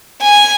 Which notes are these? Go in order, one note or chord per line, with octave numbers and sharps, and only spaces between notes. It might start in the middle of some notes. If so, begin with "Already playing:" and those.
G#5